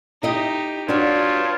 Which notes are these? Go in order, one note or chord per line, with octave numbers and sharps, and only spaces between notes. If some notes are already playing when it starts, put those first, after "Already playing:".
D#4 E4 G4 D#5
G2 D4 F4 F#4 C#5